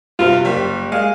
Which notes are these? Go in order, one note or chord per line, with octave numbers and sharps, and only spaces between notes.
G2 C3 F4
F#1 G3 B6
G#3 F5